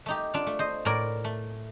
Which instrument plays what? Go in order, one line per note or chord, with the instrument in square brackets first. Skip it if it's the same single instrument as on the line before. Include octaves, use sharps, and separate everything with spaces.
[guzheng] A3 D#4 G4
D4 F4
A3
C5 D#5
A2 A#4 D5
A3